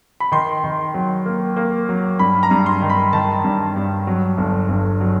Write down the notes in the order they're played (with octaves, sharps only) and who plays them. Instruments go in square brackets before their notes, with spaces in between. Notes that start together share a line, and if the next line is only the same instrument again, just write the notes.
[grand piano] B5
D#3 C6
D#3
F#3
A#3
A#3
F#3
G2 B5
A#5
G2
C6
D#3
B5
D#3 A5
G2
G2
F#3
G1
G1
F#3